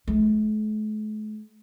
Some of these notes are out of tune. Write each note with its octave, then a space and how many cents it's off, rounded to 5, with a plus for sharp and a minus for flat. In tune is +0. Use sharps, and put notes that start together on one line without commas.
A3 -45